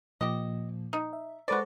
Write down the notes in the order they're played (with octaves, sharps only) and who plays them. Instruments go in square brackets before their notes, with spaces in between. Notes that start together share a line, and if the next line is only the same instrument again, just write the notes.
[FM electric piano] A#2 F3 A#3 [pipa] G4 D#5
[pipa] D#4
[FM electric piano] E5
[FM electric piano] G#3 A4 C5 [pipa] F#4 B4 D5